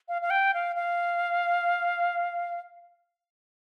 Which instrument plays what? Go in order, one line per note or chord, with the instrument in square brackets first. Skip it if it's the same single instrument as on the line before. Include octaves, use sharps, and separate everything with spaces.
[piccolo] F5
F5
G5
F5
F5